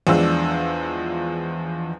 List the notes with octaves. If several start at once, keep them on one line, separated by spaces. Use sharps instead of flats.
E2 F3 G#3 D4 E6